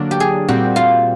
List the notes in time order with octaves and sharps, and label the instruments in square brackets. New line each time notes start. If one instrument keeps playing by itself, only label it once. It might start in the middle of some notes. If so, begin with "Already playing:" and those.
Already playing: [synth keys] D3 F#3 A#3 D4
[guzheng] G4
G#4
[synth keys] A#2 G3 C4 [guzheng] F#4
[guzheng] F4